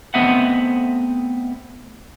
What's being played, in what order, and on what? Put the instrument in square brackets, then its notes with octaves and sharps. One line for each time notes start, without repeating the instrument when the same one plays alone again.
[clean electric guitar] A3 B3 C4 D#5 E5 F#5